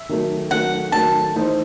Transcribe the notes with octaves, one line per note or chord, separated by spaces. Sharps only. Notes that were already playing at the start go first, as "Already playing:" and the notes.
Already playing: E5
D#3 F#3 A3
D#3 F#3 A3 F#5
D#3 F#3 A3 A5
E3 A3 D#4 A4 C5